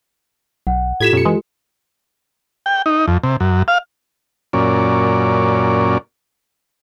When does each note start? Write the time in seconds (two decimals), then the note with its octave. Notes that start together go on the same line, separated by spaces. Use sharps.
0.67 B1 F#5
1.00 A2 F4 G4 A4 G#6 B6 E7
1.13 F#2 B2 C#7
1.25 E3 G#3
2.66 G5
2.86 D#4
3.08 F2
3.23 C3
3.40 F#2
3.68 F5
4.53 F#2 A#2 C#4 D5